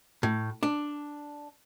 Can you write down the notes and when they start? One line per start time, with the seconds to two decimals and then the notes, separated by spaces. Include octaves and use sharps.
0.23 A2
0.63 D4